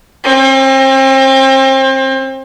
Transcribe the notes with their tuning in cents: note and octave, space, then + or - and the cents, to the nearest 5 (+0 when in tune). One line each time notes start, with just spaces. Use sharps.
C4 +35